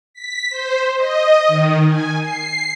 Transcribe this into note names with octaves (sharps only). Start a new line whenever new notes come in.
B6
C5
D#5
D#3
G#5
C7